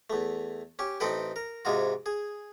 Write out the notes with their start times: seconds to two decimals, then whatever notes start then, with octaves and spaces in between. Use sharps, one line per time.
0.10 E2 A3
0.79 C#4 G4
1.00 A1 C4 D#4 A4 B4 G5
1.36 A#4
1.65 G#2 C3 G#3 F4 F#4
2.06 G#4